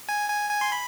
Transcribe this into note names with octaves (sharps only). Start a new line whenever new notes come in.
G#5
G#5
G#5
C6
B5